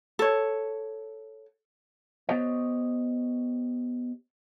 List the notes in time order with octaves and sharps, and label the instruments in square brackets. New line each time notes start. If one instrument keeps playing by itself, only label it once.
[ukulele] A4 C#5
[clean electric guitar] B3 G4 C5 C#5 D#5